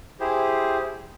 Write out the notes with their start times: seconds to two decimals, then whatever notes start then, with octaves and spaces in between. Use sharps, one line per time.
0.20 E4 G4 G#4 C5